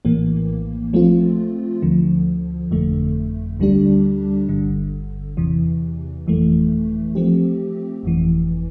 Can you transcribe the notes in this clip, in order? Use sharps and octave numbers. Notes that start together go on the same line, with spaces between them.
A#1 A2 E3 A#3
F3 A3 C4 F4
D2 D3 F3
G1 F2 D3 A3
D2 D3 G3 D4 G4
G1 G2 D3
E2 C3 E3
G1 F2 E3 A3
F3 A3 C4 G4
G1 F2 E3